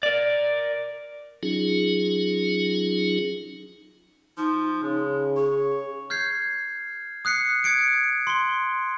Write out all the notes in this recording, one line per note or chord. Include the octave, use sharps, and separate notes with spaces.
A#4 D5
F#3 C#4 D#4 F4 G#4
F3 D#4
C#3 G#3
G#4 C#5
F6 G6 G#6 C7
D#6 F#6 C7 C#7
D#6 G#6 C#7 D7
C6 G7